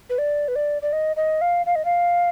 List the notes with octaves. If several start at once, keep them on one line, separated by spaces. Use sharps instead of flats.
B4
D5
B4
D5
D5
D#5
D#5
F5
F5
D#5
F5